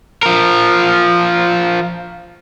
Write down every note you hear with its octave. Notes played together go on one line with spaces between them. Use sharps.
F3 A#4